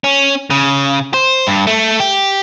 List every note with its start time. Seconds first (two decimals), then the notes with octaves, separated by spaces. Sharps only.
0.04 C#4
0.50 C#3
1.14 C5
1.47 G2
1.67 A3
2.00 G4